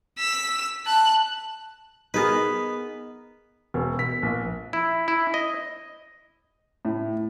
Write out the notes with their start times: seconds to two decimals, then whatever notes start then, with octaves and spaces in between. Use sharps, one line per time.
0.19 E6 B6
0.86 A5 F#6
2.14 B3 D#4 G#4 A#4 B4
3.74 E1
3.99 B6
4.23 A#1
4.73 E4
5.08 E4
5.34 D#5
6.85 A2